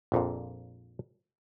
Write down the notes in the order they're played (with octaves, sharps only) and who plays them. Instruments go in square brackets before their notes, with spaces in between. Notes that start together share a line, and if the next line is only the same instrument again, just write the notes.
[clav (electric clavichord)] A#1 F2 A#2